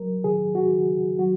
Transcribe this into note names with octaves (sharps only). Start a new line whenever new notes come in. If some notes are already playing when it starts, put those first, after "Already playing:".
Already playing: F#3 A#4
D#3 G#4
F#4
D#3
F#3 F#4